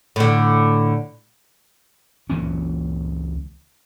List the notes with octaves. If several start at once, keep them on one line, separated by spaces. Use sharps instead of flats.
A2 D3
C#2 E3 A#3 C#4